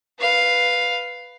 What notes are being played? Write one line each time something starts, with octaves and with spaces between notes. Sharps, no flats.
B4 F5